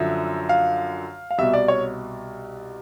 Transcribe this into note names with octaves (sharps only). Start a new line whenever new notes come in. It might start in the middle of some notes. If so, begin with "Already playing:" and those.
Already playing: F#2 D3 F3 E5
F5
F5
C2 B2 E5
D5
C#5